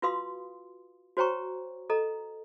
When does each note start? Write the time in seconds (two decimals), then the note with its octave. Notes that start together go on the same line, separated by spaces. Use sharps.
0.02 F4 F#4 B4 F5 C6 D#6
1.17 F#4 C5 C#5 G5 A#5 C#6
1.90 A4 D#5 A#5